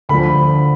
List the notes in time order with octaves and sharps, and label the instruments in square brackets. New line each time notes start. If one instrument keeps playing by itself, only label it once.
[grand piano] D2 D3 F3 B5